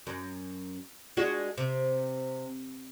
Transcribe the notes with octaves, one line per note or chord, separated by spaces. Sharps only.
F#2
G#3 D4 F#4
C3